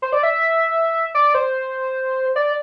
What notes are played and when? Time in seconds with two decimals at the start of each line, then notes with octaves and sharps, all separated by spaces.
0.02 C5
0.12 D5
0.23 E5
1.15 D5
1.34 C5
2.36 D5